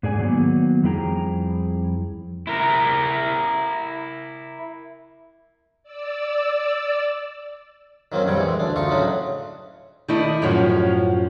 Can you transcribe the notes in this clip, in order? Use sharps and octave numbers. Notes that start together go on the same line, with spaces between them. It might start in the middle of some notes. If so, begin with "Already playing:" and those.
G#2 G#4 D5 G#5
D#3 F#3 A#3 B3 D#4
F2 G3 E4 G#4 G5 A#5
E4 A#4
D5 E6
D#3 F#3 A#3 C4 C#4
A#1 F2 G3 C#5 G5
E3 G#3
D2 D4
D2 D#4 F4 C#6
A2 C#3 F#3 D4 D#4
D#3 A3 D#4 E4 D5 D#5
F#2 A2 F3 C#4 F#4